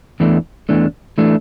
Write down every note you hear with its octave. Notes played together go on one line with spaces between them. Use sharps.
E2 E3 A3 D4
E2 E3 A3 D4
E3 A3 D4